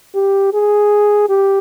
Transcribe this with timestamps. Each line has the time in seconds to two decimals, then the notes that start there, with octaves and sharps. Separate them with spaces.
0.15 G4
0.54 G#4
1.29 G4